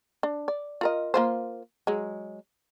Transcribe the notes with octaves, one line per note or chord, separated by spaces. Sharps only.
D4
D5
F4 A#4 D#5
A#3 F4 C5
F#3 G#3